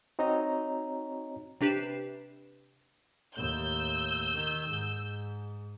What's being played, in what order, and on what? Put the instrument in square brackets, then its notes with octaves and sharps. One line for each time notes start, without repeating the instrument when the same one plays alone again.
[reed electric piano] C4 D#4 F#4 C#5 D#5 A#5
[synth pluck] C3 D4 G4 B4 C7 E7
[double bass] D#2 A2 [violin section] E6 G6
[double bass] D#3
G#2